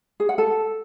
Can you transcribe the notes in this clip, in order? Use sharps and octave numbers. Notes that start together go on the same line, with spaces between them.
G#4
F#5
A4